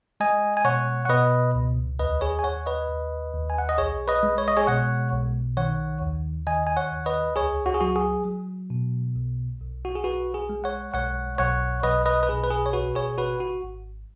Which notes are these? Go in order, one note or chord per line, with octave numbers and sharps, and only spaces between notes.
G#3 D#5 G#5
G#5
B2 C#5 F#5
F#5
B2 B4 D#5
C#2
D#2 B4 D#5
G#4 C#5
G#5
D#2 C#5 F#5
B4 D#5
D#2
D#2
G#5
F#5
D#5
B1 G#4 C#5
B4 D#5
G#3
C#5
D#5
G#4 C#5
B2 C#5 F#5
B1
D#3 C#5 F#5
D#2
D#3 D#5 G#5
G#5
C#5 F#5
D#2
B4 D#5
C#2 G#4 C#5
F#4
G#4
F#3 F#4
G#4
F#3
B2
B1
B1
F#4
G#4
B1 F#4 B4
G#4
G#3
C#5 F#5
B1 C#5 F#5
B1 C#5 F#5
B1 B4 D#5
B4 D#5
B4
B2 G#4
B4
G#4
C#5
G#1 F#4 B4
G#4 C#5
G#1 F#4 B4
F#4
G#1